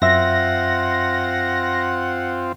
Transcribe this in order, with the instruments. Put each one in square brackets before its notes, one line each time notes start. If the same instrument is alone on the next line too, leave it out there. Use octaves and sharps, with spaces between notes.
[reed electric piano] F#2 E5 [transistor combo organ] C4 F4 [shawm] F#5 [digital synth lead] A#6